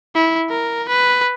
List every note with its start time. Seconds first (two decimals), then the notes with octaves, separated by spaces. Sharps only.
0.15 E4
0.49 A#4
0.89 B4